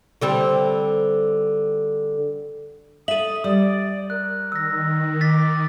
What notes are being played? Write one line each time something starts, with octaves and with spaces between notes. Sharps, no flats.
D3 G3 C4
A4 E5 D#6 D#7 F#7
G3 D5 D#6
A#4 F#6
D#3 E6 A#6
D6 A6 B6